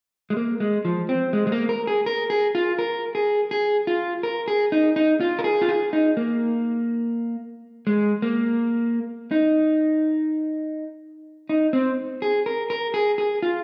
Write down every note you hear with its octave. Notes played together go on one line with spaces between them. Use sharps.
G#3
A#3
G#3
F3
C4
G#3
G#3
A#3
A#4
G#4
A#4
G#4
F4
A#4
G#4
G#4
F4
A#4
G#4
D#4
D#4
F4
A#4
G#4
F4
G#4
D#4
A#3
G#3
A#3
D#4
D#4
C4
G#4
A#4
A#4
G#4
G#4
F4